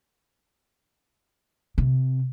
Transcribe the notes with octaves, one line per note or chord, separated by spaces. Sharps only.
C3